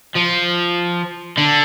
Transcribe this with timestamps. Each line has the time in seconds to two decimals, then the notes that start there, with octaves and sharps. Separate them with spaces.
0.15 F3
1.38 D3